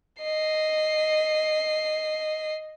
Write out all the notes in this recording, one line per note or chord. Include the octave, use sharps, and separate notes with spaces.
D#5 C7